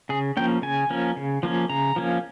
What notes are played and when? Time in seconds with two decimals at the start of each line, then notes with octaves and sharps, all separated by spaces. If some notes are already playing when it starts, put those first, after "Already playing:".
0.09 C#3 G#4
0.37 F3 A#3 C#4 G5
0.62 C#3 G#5
0.90 F3 A#3 C#4
1.16 C#3
1.43 F3 A#3 C#4
1.69 C#3 A#5
1.96 F3 A#3 C#4